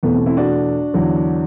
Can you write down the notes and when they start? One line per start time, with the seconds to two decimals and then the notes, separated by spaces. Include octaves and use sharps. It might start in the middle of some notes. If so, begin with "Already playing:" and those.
0.03 E2 B2 A3 B3
0.14 C4
0.26 C4 E4
0.37 D4 F#4
0.94 E2 D3 F#3